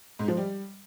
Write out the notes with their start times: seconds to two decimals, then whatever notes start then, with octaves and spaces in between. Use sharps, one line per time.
0.19 G#2
0.28 F3
0.37 G3